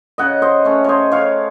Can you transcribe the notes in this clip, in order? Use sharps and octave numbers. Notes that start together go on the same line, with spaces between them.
C#3 D#5 F#5
C5 D#5
A3 C#4
C5 C#5 D#5
C#3 C#5 F5